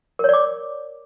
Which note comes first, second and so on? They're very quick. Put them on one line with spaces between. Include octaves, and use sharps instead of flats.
A#4 C#5 D5 D6